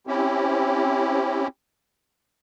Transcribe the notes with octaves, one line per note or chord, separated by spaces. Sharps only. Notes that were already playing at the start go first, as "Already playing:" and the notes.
C4 C#4 E4 G4